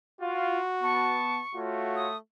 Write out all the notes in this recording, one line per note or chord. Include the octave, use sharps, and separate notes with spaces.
F4 F#4
B3 A5 C#6
A3 F4 F#4 C#5
D#6